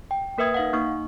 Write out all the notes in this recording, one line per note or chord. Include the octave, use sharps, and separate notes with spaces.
G5
A#3 A#4 B4 E5 D#6 G#6
D#4 F5 F#5
A#3 D#4 C#6